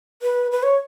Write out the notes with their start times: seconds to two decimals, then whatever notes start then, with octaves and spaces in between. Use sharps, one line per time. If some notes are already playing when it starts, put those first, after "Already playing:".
0.22 B4
0.52 B4
0.63 C#5